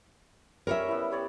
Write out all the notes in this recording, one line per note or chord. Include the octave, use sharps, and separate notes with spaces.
G3 C#4 A#4 C#5 E5
B3 E4
G3 C#5 D5